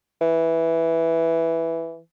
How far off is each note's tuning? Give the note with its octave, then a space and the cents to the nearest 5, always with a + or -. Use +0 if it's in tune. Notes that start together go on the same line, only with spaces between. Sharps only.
E3 +0